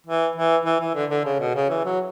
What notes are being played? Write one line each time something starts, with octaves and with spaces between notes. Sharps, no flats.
E3
E3
E3
E3
D3
D3
C#3
B2
C#3
E3
F#3